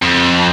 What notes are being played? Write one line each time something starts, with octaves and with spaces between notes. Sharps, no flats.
F2